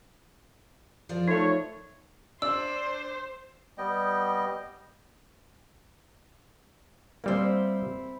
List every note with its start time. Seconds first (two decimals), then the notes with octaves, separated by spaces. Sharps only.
1.09 F3 A#4 D5
1.28 A3 D#4 C#5
2.42 D4 C5 E6
3.78 G3 B3 D#5 G5
7.24 G3 A#3 C4 E4